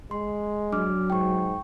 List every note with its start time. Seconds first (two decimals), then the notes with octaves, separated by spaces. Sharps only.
0.11 G#3 C6
0.72 F#3 D4 D6 F6
1.10 G#2 G5 C#6